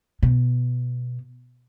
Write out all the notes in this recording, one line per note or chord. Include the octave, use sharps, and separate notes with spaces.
B2